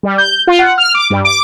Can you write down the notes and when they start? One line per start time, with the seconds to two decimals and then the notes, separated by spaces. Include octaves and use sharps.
0.03 G3
0.18 G6
0.47 F4
0.59 F#5
0.78 F6
0.95 D6
1.10 G2
1.25 D6